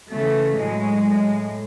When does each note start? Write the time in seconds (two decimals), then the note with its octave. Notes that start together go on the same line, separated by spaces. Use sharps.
0.11 C#3 E3 A3
0.57 A2 F#3 G#3
1.04 A2